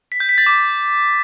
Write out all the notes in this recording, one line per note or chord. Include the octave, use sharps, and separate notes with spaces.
B6
G6
B6
A6
D6